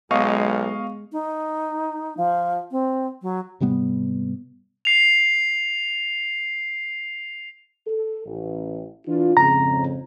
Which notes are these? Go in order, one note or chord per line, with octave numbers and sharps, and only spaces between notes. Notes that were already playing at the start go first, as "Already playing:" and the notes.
B1 G#3 B3 D#5 F5 C#6
D#4
F3
C4
F#3
G#2 C3 G3 B3
C7 F7
A4
A1
E3 D4 F4
F2 G#2 C#3 A#5